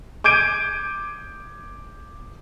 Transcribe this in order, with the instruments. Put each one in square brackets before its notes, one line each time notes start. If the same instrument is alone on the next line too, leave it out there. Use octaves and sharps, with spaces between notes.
[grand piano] D6 G6 G#6 D7 D#7